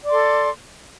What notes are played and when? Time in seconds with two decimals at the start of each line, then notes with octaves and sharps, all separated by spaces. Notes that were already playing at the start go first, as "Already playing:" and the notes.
0.03 D5
0.06 D6
0.09 C6
0.12 A4